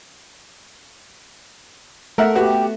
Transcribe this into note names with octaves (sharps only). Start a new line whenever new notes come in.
A3 A#4 E5 F#5
B3 F#4 G4